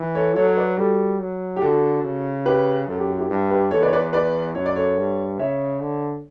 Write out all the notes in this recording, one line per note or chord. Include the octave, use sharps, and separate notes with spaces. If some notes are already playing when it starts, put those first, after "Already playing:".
Already playing: E3
A4 C#5
F#3 A4 C#5
C#5
B4 D5
G3 F#4 A4
F#3
G4
D3 F#4 A4
C#3
G4 B4
F#2 A4
G4
F#4
E4 G4
G2
G4 B4
E2 A4 C#5
B4 D5
C#5
B4 D5
B4 D5
F#2 C#5
D5
A4 C#5
G2
C#3 C#5 E5
D3